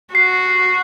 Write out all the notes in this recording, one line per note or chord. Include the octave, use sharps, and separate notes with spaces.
F#4 C7